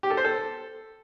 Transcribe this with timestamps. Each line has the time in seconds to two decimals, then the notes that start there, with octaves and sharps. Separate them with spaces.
0.03 G4
0.10 A4
0.17 C5
0.24 A4